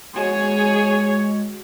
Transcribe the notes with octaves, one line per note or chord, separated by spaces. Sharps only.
G#3 F#4 G#4 C#5